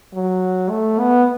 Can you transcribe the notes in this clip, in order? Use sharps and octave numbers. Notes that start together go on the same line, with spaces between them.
F#3
A3
B3